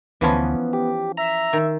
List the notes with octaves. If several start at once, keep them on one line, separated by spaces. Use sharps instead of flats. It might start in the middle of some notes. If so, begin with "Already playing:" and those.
D2 E3 F3 B3 C#4
G4
E5 A#5
D#3